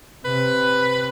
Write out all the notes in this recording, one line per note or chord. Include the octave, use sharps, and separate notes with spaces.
C3 B4